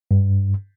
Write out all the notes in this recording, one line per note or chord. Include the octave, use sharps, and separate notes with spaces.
G2